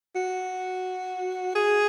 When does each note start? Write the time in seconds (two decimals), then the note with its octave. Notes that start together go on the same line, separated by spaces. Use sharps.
0.15 F#4
1.55 G#4